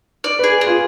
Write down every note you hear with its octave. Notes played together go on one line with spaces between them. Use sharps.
D5
G#4 B4
G#4
F4